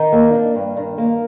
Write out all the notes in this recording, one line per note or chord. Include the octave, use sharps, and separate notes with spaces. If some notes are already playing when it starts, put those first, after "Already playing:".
Already playing: D#3 D#4
A#3
D4
G2
D#3
A#3